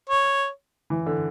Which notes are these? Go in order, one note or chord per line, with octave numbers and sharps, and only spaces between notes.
C#5
E3
D3